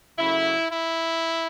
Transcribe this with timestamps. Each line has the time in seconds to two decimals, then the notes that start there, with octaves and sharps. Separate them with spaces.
0.18 C#3 F#3 A3 E4
0.71 E4